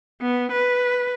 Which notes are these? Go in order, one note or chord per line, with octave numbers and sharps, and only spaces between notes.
B3
B4